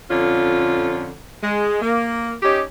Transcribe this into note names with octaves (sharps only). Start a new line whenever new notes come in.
F2 D3 C#4 F4
G#3
A#3
C#4 D#4 G4